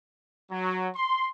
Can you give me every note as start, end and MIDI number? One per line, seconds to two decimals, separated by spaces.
0.51 0.89 54
0.96 1.28 84